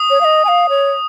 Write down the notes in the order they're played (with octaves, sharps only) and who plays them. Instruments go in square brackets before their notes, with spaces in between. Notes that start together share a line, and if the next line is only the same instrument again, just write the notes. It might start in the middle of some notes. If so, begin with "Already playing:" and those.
Already playing: [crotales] D#6
[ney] C#5
F5
D#5
G#5
F5
C#5